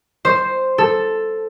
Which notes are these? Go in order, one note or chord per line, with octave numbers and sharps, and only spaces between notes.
C5
A4